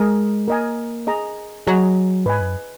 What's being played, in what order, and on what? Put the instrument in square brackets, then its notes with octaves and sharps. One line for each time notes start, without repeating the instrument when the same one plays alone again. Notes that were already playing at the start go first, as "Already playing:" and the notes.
Already playing: [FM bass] G#3 [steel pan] A#4 D#5 G#5
[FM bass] A#3 [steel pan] A#4 D#5 G#5
[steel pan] G#4 D#5 A#5
[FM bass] F#3 [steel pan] G#4 D#5 A#5
[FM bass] G#2 [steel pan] B4 D#5 G#5
[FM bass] F#2